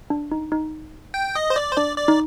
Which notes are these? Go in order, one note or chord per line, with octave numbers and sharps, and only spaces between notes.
D4
D#4
D#4
G5
D#5
C5
D5
C5
D4 D5
D5
D#4